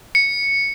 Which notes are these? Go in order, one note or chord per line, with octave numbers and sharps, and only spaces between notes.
C#7